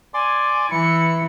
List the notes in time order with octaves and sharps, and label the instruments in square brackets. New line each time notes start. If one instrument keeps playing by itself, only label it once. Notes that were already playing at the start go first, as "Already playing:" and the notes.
[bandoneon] D5 C6 D6 [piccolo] G#5
[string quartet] E3 [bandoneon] E4 [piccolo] C#7